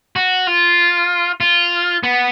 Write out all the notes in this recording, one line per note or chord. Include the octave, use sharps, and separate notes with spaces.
F#4
F4
F4
B3